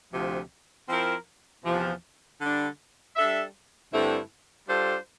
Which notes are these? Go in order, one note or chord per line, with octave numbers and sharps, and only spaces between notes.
D2 C3 F3
F3 C4 E4 A#4
E2 C3 F3
D3 G3 D4
G3 D4 A4 E5
G2 D3 A3 C4 E4
G3 D4 F4 A4 C5